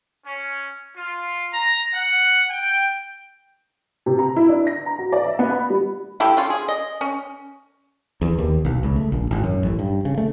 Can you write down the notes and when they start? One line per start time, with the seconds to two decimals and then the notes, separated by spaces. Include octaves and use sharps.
0.25 C#4
0.95 F4
1.53 A#5
1.93 F#5
2.50 G5
4.06 C3
4.19 A#5
4.36 E4
4.49 D4
4.67 A#6
4.86 A#5
4.99 F#4
5.12 D5
5.27 E5
5.39 B3
5.52 B5
5.70 G3
6.20 F3 A3 E4 G4
6.37 C#4 F4
6.50 G#4
6.69 D#5
7.01 C#4
8.21 E2
8.38 D#2
8.65 B1
8.83 C#2
8.96 A3
9.12 A#1
9.31 G#1
9.44 F#2
9.63 A1
9.79 G2
10.05 C#3
10.18 A3